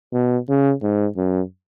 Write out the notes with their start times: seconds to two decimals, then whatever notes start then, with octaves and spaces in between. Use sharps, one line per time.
0.13 B2
0.49 C#3
0.82 G#2
1.17 F#2